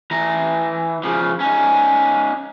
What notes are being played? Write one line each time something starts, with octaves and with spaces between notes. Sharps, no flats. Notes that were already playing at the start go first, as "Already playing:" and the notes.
E3 A#5
C#3 F3
C#4 D#4